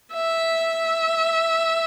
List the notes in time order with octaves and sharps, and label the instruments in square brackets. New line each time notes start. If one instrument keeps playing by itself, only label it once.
[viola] E5